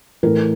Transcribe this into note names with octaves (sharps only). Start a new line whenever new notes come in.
A2 E3 A#4